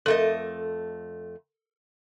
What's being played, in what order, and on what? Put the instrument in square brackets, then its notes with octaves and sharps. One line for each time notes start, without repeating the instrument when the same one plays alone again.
[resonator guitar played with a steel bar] F2 A3 D#5 [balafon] A4 A#4